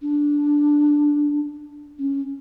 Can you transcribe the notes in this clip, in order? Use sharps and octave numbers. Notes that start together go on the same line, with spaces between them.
D4
C#4